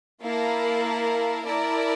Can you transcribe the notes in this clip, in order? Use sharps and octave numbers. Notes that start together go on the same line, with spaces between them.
A#3 E4 A#4 F5 A5
E4 A#4 D5 A5